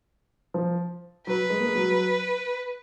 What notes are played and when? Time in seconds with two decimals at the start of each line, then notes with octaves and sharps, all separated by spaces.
0.54 F3
1.27 F#3 B4
1.50 G#3
1.59 A#3
1.65 G#3
1.75 F#3